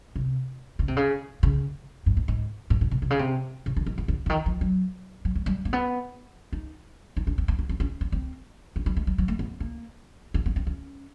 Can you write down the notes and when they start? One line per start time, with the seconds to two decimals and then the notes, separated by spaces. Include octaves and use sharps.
0.16 C3
0.79 C#3
0.88 C3
0.97 C#3
1.43 C#3
2.06 G2
2.17 G#2
2.28 G#2
2.70 A2
2.81 A#2
2.91 B2
3.02 C3
3.10 C#3
3.19 C3
3.66 C#3
3.76 D3
3.86 D#3
3.98 D3
4.08 D3
4.26 D3
4.29 D#3
4.46 F3
4.61 F#3
5.25 F#3
5.35 G3
5.46 G3
5.65 A#3
5.73 B3
6.52 D#4
7.17 D#4
7.27 D4
7.38 C4
7.48 B3
7.59 B3
7.69 C4
7.80 C#4
8.01 A#3
8.12 C4
8.76 C#4
8.86 G3
8.97 G#3
9.07 G3
9.18 F#3
9.28 A3
9.39 B3
9.60 A#3
10.34 A#3
10.46 B3
10.56 C4
10.67 C#4